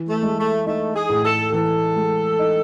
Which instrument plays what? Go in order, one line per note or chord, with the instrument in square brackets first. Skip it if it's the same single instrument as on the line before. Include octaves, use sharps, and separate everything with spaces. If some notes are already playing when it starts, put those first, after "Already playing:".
Already playing: [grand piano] E3
[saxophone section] A3
[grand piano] G#3
[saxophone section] A3
[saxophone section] A3 [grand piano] D#4
[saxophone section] G#4
[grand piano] A2
[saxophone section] A4
[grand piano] E3 [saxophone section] A4
[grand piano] G#3
D#4